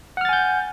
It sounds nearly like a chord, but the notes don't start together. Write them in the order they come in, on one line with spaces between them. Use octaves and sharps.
F#5 F6 A6 G#5 G6